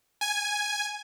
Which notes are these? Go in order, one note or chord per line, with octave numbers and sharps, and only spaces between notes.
G#5